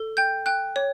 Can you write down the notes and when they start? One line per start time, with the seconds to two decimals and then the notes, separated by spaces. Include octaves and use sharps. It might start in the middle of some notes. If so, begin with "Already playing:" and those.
Already playing: A4
0.17 G5 G6
0.46 G5 F#6
0.76 C#5